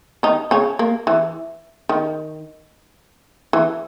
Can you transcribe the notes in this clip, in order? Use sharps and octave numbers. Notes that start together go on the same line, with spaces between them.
D#3 D#4
C#3 C#4
A#3
E3
D#3
E3